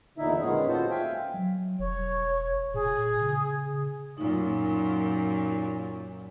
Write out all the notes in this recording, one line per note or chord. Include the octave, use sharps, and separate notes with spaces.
E2 A#2 D3 D#4 E4 E5
A#2 D#3 G#3 B3 C#4 G#4
C4 F4 F#4 A4 C5
E5 F5 G5 G#5
F#3
E1 C#5
A#2 G#4
C#3
F#2 A#2 D#4